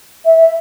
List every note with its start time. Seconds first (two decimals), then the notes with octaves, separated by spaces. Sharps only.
0.25 E5
0.38 E5